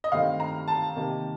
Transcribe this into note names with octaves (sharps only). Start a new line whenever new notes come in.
D#5
G2 D#3 A3 C4 F5
A#5
A5
C3 D#3 A#3